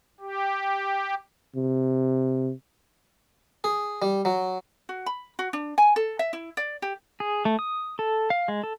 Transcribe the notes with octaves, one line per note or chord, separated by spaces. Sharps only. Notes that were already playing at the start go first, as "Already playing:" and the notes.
G4
C3
G#4
G3
F#3
F#4
B5
F#4
D4
G#5
A4
E5
E4
D5
G4
G#4
A3
D#6
A4
F5
G#3
A4